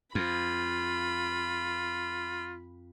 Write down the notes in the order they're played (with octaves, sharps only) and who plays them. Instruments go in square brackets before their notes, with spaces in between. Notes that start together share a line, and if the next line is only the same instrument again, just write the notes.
[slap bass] F2 [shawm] F4 [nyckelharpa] B5